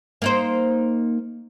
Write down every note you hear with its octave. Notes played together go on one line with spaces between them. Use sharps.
A#3 D#4 C5